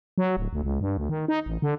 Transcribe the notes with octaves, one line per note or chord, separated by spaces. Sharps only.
F#3
D1
D2
C#2
G2
D2
D#3
D#4
A1
D3